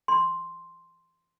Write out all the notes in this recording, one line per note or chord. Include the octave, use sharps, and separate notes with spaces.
C6